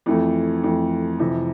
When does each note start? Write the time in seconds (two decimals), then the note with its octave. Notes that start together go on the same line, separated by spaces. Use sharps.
0.06 F2 E3 A3
0.63 F2 E3 A3
1.19 F2 C3 E3